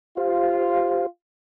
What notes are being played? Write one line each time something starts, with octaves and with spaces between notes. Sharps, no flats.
F4 G4 C5 F5